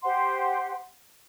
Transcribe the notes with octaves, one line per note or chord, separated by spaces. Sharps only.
G4 C5 F#5 C6